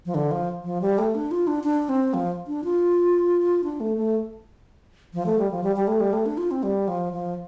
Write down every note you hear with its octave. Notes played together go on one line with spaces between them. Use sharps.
F3
D3
F3
F3
G3
A3
D4
F4
D4
D4
C4
F3
D4
F4
D4
A3
A3
F3
A3
G3
F3
G3
G3
A3
G3
A3
D4
F4
C4
G3
F3
F3